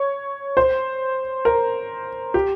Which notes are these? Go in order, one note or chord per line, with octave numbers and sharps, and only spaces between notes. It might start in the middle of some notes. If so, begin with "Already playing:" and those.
Already playing: C#5
C5
A#4
G4